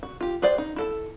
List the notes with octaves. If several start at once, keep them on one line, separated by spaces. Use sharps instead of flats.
F#4
F4 G4
G#4 B4 C5 D5 G5
D#4
E4 A4 A5